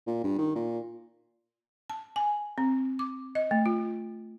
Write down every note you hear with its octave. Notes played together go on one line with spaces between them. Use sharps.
A#2
G2
D#3
A#2
A5
G#5
C4
D6
D#5
A3
F4